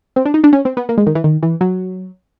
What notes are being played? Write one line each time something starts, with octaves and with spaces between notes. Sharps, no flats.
C4
D4
D#4
D4
C#4
C4
B3
A#3
G#3
D#3
E3
D#3
E3
F#3